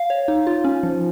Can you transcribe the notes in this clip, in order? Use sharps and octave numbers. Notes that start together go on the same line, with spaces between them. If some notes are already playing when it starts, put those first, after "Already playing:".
Already playing: F5
C#5
D#4
F4
C#4
F3